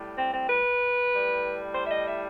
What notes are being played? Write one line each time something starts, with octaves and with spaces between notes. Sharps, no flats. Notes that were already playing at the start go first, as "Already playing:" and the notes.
Already playing: A2 G3
C4
C4
B4
A2 G3
C5
E5
D#5
E5